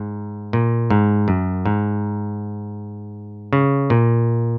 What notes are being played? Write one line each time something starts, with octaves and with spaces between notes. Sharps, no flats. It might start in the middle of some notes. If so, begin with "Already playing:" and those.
Already playing: G#2
A#2
G#2
F#2
G#2
C#3
A#2